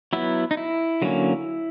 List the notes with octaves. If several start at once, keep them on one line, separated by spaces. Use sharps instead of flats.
F#3 B3 E4
D#4
E4
D3 F#3 A#3 C#4